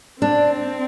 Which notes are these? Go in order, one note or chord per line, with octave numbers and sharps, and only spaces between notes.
C4 D4